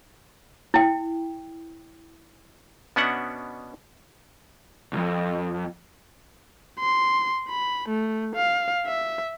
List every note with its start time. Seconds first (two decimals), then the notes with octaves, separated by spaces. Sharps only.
0.74 E4 G5
2.96 B2 B3 C#4 D4 E5 F#5
4.93 C2 F2
6.80 C6
7.49 B5
7.89 A3
8.35 F5
8.87 E5